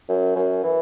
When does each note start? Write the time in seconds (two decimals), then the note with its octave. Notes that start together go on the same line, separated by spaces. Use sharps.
0.09 F#2
0.36 F#2
0.63 E3